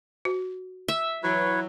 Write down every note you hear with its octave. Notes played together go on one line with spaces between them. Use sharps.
F#4
E5
E3 F#3 B4 C#5